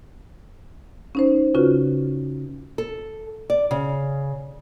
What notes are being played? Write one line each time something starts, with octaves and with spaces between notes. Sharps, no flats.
C#4 D#4 C5
C#3 C#4 F4 F#4 B4
A4
D5
C#3